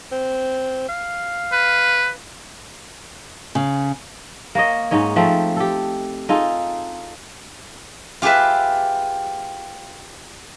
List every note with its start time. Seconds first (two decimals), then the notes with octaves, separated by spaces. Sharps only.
0.12 C4
0.89 F5
1.52 B4
3.55 C#3
4.55 A#3 A#4 C#5 D#5
4.91 G#2 C#4 D#4 C#5
5.16 F3 A3 C4
5.56 G4 A4
6.29 D#4 F4 G#4 A4
8.22 F4 G4 G#4 B4 E5